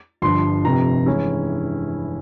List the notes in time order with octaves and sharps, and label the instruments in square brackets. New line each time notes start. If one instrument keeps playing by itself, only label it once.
[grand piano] G1 G2 F3 C6
F1 F2 C3 A#5
G2 E3 G#3 C#4 E4